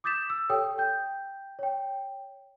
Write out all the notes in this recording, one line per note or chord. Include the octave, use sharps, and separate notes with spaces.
D6 D#6 G6 A6 B6 E7
E6
G4 A4 C#5 G5 D#6
G5 G6
C#5 G5